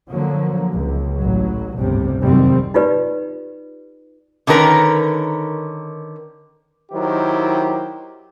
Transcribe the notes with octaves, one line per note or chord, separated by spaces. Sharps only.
D3 F3 F#3 A#3
C#2
A1 F#3
G1 C#2 A2 C3 G3
F1 C2 F#2 D#3 G3 C4
D#4 F4 G4 B4 D5
D3 D#3 C#4 A#4 B4
D#3 F#3 E4 G4 C5